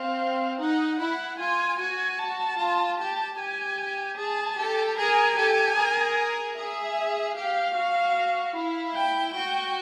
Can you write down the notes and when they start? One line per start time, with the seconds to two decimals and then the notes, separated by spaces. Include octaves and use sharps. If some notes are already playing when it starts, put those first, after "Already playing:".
Already playing: C4 F5
0.60 D#4 F#5
1.00 E4 F#5
1.40 F4 G#5
1.80 F#4 G#5
2.19 A5
2.59 F4
2.98 G4 A5
3.39 G4 G#5
4.18 G#4 A5
4.58 G4 A4
4.97 G#4 A#4 G#5
5.37 G4 A4
5.77 G#4 A#4
6.56 G#4 E5
7.36 G4 F5
7.76 F#4
8.56 E4
8.95 G5
9.34 F#4 G5